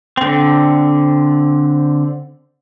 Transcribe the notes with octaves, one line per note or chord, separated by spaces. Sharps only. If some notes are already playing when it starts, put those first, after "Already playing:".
D3 C4